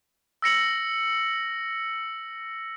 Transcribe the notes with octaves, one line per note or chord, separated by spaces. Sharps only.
E6 A#6 C#7 F#7